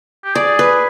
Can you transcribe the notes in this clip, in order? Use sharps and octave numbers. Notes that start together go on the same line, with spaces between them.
G4
G#4 D5
B4